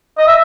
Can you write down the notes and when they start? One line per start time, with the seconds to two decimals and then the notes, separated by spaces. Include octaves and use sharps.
0.18 D#5
0.27 E5